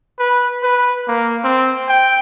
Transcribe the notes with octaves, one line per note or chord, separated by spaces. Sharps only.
B4
B4
A#3
C4
G5